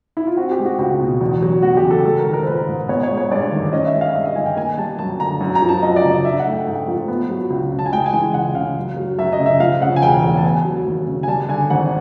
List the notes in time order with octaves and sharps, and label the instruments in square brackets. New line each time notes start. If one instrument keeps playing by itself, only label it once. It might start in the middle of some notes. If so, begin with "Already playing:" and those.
[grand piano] E4
F4
C4 F#4
G4
G#3
F#4
C#2 F#4
B2
E2
F#3
E2 F#4
G4
C#3
A4
G#3 A4
A#4
D#3
A#4
C5
A#1 B4
G#2
B3 C#5
C#5
G#3
C#5
G2 D5
D#3
C#4 D#5
E5
G#3
F5
G2 E5
D#5
D#3 G#5
G5
A#3 G#5
G3 A5
F#2 A5
D3 A#5
F#2
A#5
F3
A5
F#2 D#5
D5
C#3
D#5
D4 E5
F#5
A3
G5
G#2 G5
F3
B3
F#3
C#2
C#3
A5
G#5
G#3 G5
G#5
E3
C#2 F#5
C#3 F5
F#2
F#3
F#2 E5
D#5
C#3
E5
F3 F5
C#3 F#5
G#5
E1 G5
E2
A5
B3 G#5
F#3
D#2
C#3
G#5
G3 A5
D3 G#5
G#1 F#5